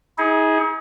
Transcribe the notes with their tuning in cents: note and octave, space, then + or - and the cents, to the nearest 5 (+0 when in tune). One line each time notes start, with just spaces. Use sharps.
D#4 +45 G#4 +0